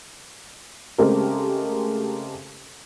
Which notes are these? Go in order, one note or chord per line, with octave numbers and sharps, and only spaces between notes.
C#3 G#3 A3 C4 G4 A#4